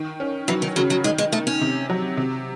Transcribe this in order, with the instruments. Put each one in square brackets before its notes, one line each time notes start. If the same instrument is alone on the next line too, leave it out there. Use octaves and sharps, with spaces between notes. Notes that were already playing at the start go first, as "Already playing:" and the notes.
Already playing: [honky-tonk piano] D#3
C#4
[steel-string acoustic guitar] E3 [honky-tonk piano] F#3
[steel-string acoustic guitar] D#3
[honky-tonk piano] C#3 [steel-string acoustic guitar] F#3
[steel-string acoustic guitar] F#3
[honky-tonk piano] D#3 [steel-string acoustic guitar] G#3
[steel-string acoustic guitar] G#3
[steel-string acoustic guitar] A3 [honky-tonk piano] D#4
[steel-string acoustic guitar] C#4
[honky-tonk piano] C3
F#3
C3